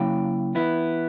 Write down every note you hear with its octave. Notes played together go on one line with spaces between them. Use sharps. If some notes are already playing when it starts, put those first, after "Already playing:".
Already playing: C#3 F#3 A#3 E4 G5
E3 B3 E4